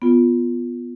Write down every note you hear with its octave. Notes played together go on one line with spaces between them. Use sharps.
B3 F4